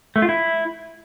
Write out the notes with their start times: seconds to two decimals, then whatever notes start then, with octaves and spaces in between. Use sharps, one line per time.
0.16 A3
0.22 F4
0.29 E4